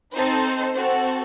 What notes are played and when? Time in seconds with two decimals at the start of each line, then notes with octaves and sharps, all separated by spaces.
0.14 C4 D#4 A4 C5
0.76 C4 F#4 A4